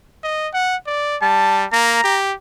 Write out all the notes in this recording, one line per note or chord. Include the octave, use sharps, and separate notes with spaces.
D#5
F#5
D5
G3 A5
A#3 A#5
G4